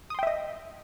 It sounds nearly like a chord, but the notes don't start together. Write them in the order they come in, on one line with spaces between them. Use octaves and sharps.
D#6 C6 G5 E5 D#5